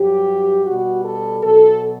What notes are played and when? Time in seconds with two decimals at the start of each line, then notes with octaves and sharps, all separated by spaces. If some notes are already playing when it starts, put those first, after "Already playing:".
Already playing: G2 F#3 G4
0.66 B2 G3 F#4
1.04 A4
1.42 B2 F#3 A4